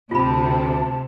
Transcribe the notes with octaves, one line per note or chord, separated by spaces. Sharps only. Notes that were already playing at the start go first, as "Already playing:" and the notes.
D2 C3 F4 A5 B5